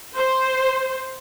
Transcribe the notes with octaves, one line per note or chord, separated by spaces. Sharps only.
C5